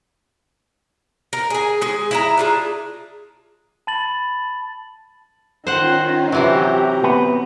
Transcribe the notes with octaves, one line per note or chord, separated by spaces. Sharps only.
A#4
G#4 G#5
G#3 G#4
E4 E5 A#5
D4 F4 G#4
A5 B5 A6 F#7
D#3 C#4 D#4 F4 C5 F#5
C3 E3 F#3 G4 A#5
B3